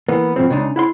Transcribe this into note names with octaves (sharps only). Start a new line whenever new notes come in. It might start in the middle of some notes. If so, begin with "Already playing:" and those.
E3 A#3 B3
G2 B2 F3 C4
C#2 C#3 G#3 D4 D#4
E4 F#5 C6